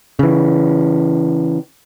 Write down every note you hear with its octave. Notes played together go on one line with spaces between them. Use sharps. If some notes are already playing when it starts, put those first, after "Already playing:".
C#3 E3